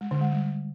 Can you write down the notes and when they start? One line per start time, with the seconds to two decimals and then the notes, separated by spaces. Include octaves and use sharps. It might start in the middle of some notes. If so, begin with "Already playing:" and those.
0.01 G#3
0.11 D3
0.21 G#3
0.31 G3